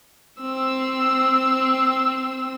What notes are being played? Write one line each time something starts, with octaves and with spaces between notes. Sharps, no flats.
C4 E6